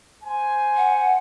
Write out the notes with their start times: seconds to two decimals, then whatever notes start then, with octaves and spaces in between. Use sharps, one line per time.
0.24 C5 G#5
0.77 F#5